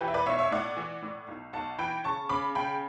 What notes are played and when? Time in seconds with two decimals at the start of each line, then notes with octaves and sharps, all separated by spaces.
0.01 E3 G4 B4
0.08 E5
0.14 B4 D5
0.26 B1 C#5 E5
0.39 C#5 E5
0.51 A2 D5 F#5
0.77 E3
1.02 A2
1.28 B1
1.53 B1 F#5 A5
1.78 E3 G5 B5
2.04 C#3 A5 C#6
2.29 C#3 B5 D6
2.55 C#3 G5 B5